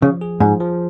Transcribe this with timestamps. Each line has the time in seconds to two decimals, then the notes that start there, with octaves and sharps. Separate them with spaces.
0.02 C#3 F3
0.21 G#4
0.40 G#2 F3
0.60 F3